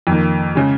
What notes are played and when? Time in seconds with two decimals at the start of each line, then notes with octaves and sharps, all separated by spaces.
0.07 F2 D#3 A#3
0.55 C#3 G#3